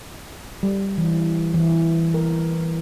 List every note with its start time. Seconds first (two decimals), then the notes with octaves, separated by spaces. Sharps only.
0.63 G3
0.98 E3
1.54 E3
2.14 A#4